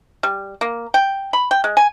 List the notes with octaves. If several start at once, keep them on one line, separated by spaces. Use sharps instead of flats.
G3
A#3
G5
B5
G5
G#3
G#5